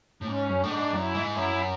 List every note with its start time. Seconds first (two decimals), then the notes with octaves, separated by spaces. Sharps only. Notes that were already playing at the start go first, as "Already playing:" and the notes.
0.21 A2
0.27 G#2 C#4
0.49 F#2
0.59 A2 D4
0.71 G#2
0.93 F#2 E4
1.15 G#2
1.26 E4
1.36 F#2